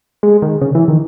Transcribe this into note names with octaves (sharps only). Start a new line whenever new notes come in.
G#3
D#3
C#3
E3
D#3